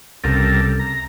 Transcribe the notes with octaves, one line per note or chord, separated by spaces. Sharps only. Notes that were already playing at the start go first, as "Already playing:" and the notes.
C2 C#3 G3 A4 A#4
A#5